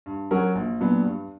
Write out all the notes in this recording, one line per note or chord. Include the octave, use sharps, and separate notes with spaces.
G2
F#3 C#4 F#4 A#4
A#1
A#2 F#3 B3 D4
G2